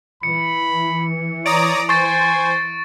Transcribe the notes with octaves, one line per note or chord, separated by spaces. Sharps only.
E3 B5 C#7
C#5 D5 A#5 D#6 D7
C5 G#5 C#6 A6